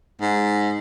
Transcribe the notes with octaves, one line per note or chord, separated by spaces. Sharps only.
G#2